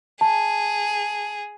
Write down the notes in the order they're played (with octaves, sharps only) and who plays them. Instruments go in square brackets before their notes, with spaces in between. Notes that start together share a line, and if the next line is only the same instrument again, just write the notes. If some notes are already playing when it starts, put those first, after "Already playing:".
[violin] G#4 [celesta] A5